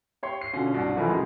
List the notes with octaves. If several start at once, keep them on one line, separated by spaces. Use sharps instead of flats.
G4 C#5 C6
C7
B2 D3 C#4 F4
C2 G2 B2
F1 E3 F3 A#4 G#5 B5
C#2 B2 G#3